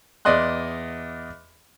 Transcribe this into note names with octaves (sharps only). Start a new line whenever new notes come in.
E2 D5 D#5 C6 F#6